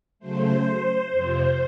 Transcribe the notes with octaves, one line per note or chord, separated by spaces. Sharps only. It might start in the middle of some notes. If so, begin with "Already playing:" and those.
C#3 F#3 A3 C5
F2 C3 F3